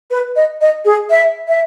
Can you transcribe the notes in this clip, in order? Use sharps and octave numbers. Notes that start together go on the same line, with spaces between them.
B4
D#5
D#5
G#4
E5
E5